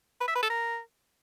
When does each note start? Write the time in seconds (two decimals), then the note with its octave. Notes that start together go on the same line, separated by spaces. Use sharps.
0.21 B4
0.28 E5
0.36 B4
0.43 A4
0.50 A#4